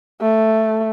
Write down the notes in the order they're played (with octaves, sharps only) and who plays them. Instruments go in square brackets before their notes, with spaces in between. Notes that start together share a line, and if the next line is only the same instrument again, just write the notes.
[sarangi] A3